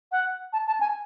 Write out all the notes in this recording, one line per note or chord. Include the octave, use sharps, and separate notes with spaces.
F#5
A5
A5
G#5